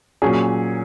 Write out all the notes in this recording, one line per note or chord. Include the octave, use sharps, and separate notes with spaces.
A#2 F#3 C#4 G#4